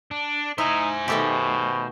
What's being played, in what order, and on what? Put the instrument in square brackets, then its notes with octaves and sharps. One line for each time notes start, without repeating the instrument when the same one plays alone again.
[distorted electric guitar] D4
[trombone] D#4 [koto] E4 [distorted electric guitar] C5 G#5
[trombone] B2 [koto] D#3 A3 G4